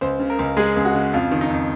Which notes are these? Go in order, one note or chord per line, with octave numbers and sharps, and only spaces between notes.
C#2 C5
C#3
A#4
C#2
G#3 G#4
C#2
F#4
C#3
F2 F4
D#3
D#4
F2